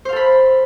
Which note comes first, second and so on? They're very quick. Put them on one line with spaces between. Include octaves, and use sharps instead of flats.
C5 F5 A4 B5